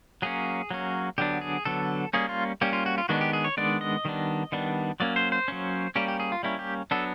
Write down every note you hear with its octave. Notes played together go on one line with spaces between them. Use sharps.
F#3 A#3 C#4 G#4
F#3 A#3 C#4
D3 F#3 B3 D4 G4
G#4
D3 F#3 B3 D4 A4
G3 A#3 C#4 G#4
F4
G3 A#3 C#4 G4
F4
F#4
F4
D#3 G#3 B3 D4 F#4
G4
G#4
C#5
D#3 G#3 B3 D4 D5
D#5
D#3 G3 B3 D4
D#3 G3 B3 D4
F#3 A#3 C#4 D5
C5
C5
F#3 A#3 C#4
G3 A#3 C#4 G4
G4
G#4
F4
G3 A#3 C#4 E4
G4
F#3 B3 D4 A4